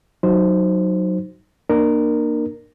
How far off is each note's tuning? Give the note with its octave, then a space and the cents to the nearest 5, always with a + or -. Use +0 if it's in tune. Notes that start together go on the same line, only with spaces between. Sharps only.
F#3 +0 D#4 +0 C5 +0
A#3 +10 D4 +35 A#4 +0